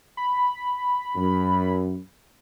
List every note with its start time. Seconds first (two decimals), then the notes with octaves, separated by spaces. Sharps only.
0.17 B5
1.16 F#2